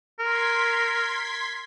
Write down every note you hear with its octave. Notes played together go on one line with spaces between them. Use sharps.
A#4 C6 G#6 B6